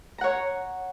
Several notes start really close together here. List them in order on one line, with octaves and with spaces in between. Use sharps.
A#5 F#5 C#5